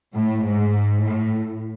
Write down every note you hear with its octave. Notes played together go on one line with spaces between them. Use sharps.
A2
G#2
A2